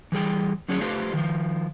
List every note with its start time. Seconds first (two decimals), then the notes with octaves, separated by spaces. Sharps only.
0.12 E3 G3 G#4 G5
0.69 D3 F#3 C#4 D4 G#4 C#5
0.81 A3 F4 G4 A4 B4 C5
1.14 D#3 F3